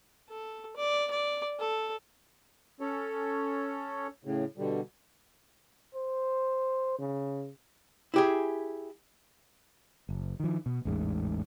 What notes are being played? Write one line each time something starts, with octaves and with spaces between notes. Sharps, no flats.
A4
D5
D5
A4
C#4 A4 C#5
A2 C#3
B2 D3 G3
C5
C#3
E4 G4 G#4
F#1
D#3 F3
B2
A1 E2 G#2 G#3